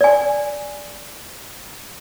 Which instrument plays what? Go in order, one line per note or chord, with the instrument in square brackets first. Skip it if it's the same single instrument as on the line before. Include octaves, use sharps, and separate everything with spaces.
[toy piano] D5 G#5